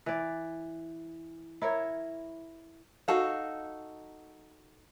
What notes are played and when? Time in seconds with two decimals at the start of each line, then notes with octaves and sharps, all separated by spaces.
0.06 E3 D5
1.62 E4 A#4 C#5 E5
3.08 D#4 F#4 A4 F5